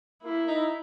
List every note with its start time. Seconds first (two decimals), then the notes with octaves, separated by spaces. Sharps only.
0.24 A#3 E4
0.48 D#4